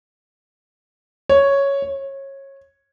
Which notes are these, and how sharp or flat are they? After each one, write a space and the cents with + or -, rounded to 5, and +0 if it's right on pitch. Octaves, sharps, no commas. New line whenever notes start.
C#5 +0
C#5 -25